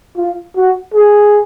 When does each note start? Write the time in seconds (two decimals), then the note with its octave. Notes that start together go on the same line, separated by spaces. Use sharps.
0.17 F4
0.56 F#4
0.94 G#4